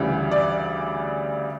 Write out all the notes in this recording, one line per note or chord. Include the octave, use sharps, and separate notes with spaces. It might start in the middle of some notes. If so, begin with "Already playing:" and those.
Already playing: D2 C#3 E3 G3
D5